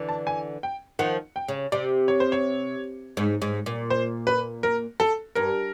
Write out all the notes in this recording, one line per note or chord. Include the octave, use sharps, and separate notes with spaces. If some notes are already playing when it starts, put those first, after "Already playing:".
Already playing: D3 E3
A5
G#5
G5
D#3 F3 F#5
G5
C#3
C3 D5
C#5
C5
C#5
G#2
G#2
A#2
C5
B4
A#4
A4
G2 A#4